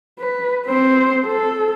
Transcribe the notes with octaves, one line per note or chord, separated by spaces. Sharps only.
B4
C4 C5
A4